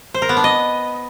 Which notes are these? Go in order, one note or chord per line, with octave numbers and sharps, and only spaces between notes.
C5
A#4
B3
D4
D#5